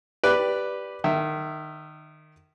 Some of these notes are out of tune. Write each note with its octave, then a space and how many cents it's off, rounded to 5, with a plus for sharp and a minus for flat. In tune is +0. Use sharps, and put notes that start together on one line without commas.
G4 +0 B4 +0 D5 +0
D#3 -20 E5 +0